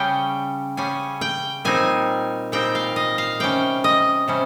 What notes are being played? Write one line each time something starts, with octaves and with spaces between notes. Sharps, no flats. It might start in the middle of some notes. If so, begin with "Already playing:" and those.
Already playing: C#3 G3 C#4 G5
C#3 G3 C#4 G#5
G5
A#2 G3 C4 D#4 G#5
A#2 G3 C4 D#4 G5
F5
D#5
F5
C3 G3 C#4 G5
D#5
C3 G3 C#4